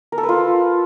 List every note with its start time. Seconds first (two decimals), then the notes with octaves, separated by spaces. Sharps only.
0.12 A#4
0.18 A4
0.23 B4
0.29 F4